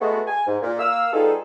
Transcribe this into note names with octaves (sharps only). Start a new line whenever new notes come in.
G#3 A3 B3 F#4
G#5
G#2
A#2
A#3 F5 E6
G3 B3 D#4 F4 G#4 A4